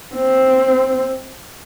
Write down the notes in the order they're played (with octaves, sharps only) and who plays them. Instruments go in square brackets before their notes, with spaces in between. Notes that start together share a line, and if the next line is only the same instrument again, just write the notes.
[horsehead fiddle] C4